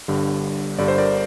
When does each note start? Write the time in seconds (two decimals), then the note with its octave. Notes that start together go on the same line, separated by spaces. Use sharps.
0.08 G1 G2 D3 G3
0.78 G1 G2 D3 G3 D5
0.88 C5
0.98 A#4 D5